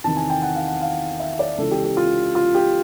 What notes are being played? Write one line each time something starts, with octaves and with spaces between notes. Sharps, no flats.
E2 C3 D#3 A5
G#5
G5
F#5
F5
F#5
F5
E5
D5
C#2 C#3 E3 A4
G4
G4
F4
F4
G4